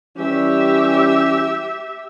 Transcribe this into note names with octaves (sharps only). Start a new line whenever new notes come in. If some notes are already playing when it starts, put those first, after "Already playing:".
E3 G3 C#4 G4 E5